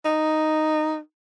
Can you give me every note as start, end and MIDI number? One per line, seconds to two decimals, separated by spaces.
0.05 0.98 63